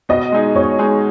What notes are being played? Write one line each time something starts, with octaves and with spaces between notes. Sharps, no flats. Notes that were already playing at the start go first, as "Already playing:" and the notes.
B2 D#5
G#3 D#4 G#4
B2 C#5
G#3 D#4 G#4